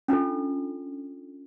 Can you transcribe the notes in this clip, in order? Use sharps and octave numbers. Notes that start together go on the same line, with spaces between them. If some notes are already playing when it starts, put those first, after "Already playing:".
C#4 D4 F4 A4